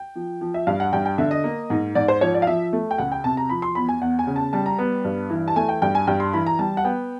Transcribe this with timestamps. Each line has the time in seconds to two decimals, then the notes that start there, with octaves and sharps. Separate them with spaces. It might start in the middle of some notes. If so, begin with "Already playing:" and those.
Already playing: G5
0.16 F3
0.41 F3
0.54 E5
0.67 G2 F5
0.80 F#5
0.93 G2 G5
1.05 G5
1.18 D3 E5
1.31 D#5
1.44 A#3
1.70 G#2
1.95 G#2 D5
2.08 C5
2.21 F3 C#5
2.34 D5
2.42 F5
2.47 F3 E5
2.73 A3
2.91 G5
2.98 C#2 F#5
3.12 G5
3.24 C3 A5
3.37 A#5
3.49 F3 B5
3.62 C6
3.75 E2 B5
3.89 G#5
4.01 E2 F#5
4.19 G#5
4.27 C#3
4.36 A5
4.53 G3 A5
4.66 A#5
4.79 B3
5.04 G2
5.30 E3
5.48 A5
5.56 A3 G#5
5.69 G5
5.82 G2 G5
5.95 G#5
6.07 G2 G5
6.20 C6
6.33 E3 B5
6.47 A#5
6.59 G3 A5
6.77 F#5
6.84 B3 G5